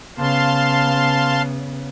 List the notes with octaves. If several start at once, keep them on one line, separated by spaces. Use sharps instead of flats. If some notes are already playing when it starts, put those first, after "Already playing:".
C#3 B3 F5 A5 C6